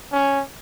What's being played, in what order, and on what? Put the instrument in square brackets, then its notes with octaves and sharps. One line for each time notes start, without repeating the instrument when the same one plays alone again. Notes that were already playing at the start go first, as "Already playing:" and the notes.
[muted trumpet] C#4